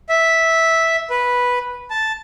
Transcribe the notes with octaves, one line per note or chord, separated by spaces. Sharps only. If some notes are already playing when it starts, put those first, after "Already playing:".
E5
B4
A5